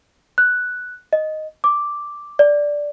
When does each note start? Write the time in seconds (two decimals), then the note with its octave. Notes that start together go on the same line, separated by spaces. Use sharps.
0.38 F#6
1.13 D#5
1.64 D6
2.39 D5